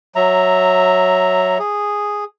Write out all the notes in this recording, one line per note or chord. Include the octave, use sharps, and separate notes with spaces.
F#3 E5 A#5
G#4